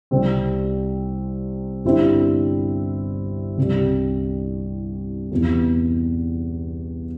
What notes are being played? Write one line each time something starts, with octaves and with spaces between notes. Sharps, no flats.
C2 C3 G3 C4
G1 G2 G3 C4 E4
C2 C3 G3
E2 C3 E3